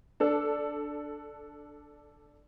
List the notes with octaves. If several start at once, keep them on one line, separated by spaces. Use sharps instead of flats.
D4 A4